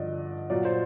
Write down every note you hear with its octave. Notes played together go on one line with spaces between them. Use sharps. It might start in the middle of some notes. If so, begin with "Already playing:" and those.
Already playing: G2 D3 F3 D5 D#5
A#2 F#3 D5
C5